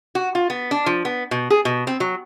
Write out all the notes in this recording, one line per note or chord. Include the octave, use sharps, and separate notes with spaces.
F#4
F4
B3
D4
F3
B3
B2
G#4
B2
C4
F#3